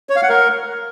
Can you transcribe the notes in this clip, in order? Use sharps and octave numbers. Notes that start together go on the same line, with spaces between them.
C#5
F5
F#5
A#4